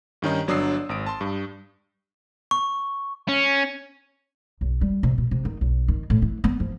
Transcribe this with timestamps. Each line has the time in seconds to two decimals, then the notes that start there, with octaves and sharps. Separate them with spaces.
0.22 G2 D#3 C#4 D#4
0.48 G1 F#3 D4 D#6 E6 C7
0.89 G#1 D#6 D7
1.06 A5 C6
1.21 G2
2.51 C#6
3.29 C#4
4.61 B1
4.81 G3
5.03 C3
5.18 B2
5.31 C3
5.45 D#3
5.61 B1
5.88 D#3
6.10 A2
6.22 E3
6.44 B3
6.60 F3